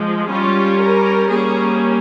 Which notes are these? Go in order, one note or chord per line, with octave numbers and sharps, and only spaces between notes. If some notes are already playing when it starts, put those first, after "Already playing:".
Already playing: F3 G#3
G3 C#4 F4
A#4
G3 A#3 C#4 G#4